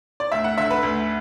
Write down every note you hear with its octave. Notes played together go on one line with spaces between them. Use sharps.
D5
D2 E5
F#5
D3 E5
B4
D2